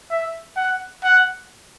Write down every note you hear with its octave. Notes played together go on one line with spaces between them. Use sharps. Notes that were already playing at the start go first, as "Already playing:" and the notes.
E5
F#5
F#5